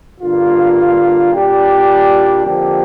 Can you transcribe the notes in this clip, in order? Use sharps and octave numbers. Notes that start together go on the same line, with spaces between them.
G2 D3 A#3 F4
A#2 G3 D4 G4
F2 D3 A#3 G4